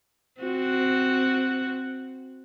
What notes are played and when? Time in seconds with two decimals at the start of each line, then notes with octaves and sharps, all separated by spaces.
0.41 C4 F#4